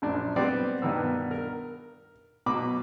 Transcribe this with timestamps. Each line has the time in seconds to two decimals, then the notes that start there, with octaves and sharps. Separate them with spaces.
0.02 A#1 F#2 D4
0.36 G3 B3 C4 C5 D5
0.82 G2 B2 D#3 B3 E6
1.31 A#4
2.46 B2 F#3 B5 D6